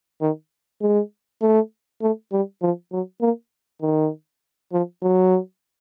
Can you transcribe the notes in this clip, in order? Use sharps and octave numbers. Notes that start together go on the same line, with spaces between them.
D#3
G#3
A3
A3
G3
F3
F#3
A#3
D#3
F3
F#3